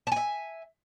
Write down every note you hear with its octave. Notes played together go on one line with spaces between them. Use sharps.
E5 G#5 A5